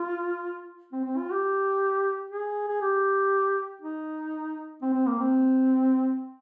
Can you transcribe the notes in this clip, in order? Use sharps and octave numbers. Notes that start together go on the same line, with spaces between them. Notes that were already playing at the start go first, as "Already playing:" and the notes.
Already playing: F4
C4
C4
F4
G4
G#4
G#4
G4
D#4
C4
C4
A#3
C4